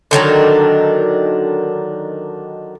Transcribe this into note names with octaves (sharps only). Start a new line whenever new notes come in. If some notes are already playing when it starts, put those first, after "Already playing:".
D3 D#3 F#3 D4